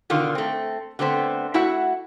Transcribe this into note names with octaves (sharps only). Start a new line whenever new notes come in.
B2 D3 D#3 F4
A3 C4
D3 A3 B3 C4 C5
A3 E4 F#4 E5 F#5